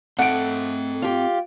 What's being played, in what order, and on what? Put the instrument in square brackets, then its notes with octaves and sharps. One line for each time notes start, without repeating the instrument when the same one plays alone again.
[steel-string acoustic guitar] A3 [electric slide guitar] C4 D#5 [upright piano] F#5 D7
[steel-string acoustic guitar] F4 G4